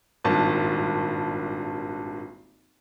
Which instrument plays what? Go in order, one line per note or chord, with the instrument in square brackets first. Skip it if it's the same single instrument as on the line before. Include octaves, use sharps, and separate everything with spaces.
[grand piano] D#1 G#1 G2 A5